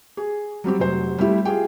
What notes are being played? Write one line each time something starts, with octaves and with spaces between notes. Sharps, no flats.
G#4
F#3 G3 C4 G4
F1 F#3 C5
G3 A3 C4 E4 G4
F4 G4 G#4 G5